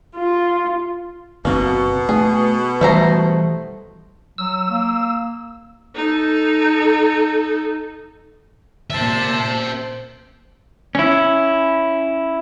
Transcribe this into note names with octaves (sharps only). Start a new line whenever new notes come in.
F4
F#1 B2 A#3 C4
A3 G#4
E3 G3 A3 C5 A#5
F#3 E6
A#3
D#4 A4
A#2 C5 E5 A5
C#4 E4